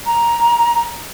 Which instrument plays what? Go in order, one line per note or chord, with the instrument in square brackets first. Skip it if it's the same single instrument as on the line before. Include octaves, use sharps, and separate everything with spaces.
[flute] A#5